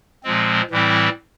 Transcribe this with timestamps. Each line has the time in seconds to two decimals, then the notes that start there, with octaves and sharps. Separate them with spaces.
0.24 A#2 F3 G#3 C4
0.71 A2 E3 G3 C4 E4